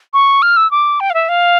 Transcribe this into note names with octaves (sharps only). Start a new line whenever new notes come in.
C#6
F6
E6
D6
G5
F5
E5
F5